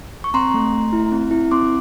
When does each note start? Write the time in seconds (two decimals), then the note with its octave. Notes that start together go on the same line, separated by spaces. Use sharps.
0.24 C#6
0.34 C4 A#5 C6
0.54 A3
0.73 A3
0.93 E4
1.12 C4
1.31 E4
1.51 C4 C6 D6